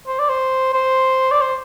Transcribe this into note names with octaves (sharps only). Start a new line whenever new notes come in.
C5
D5
C5
C5
D5
C5